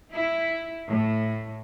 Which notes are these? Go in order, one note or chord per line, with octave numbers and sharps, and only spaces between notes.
E4
A2